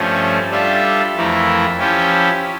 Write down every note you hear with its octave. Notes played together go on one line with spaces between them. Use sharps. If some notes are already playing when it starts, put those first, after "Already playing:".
Already playing: G2 F3 A3 C#4
G3 D4 F4 A4 E5
F2 E3 A3 E4 A#4
F3 C#4 E4 G4